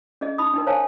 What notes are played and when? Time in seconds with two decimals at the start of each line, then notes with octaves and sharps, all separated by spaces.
0.21 C#4 G#4 D#5
0.38 D#4 B5 D#6
0.54 D4 D#4 A#4
0.67 C5 C#5 F5 G#5 A5